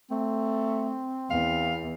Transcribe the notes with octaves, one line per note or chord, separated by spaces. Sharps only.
A3 C4
E2 F5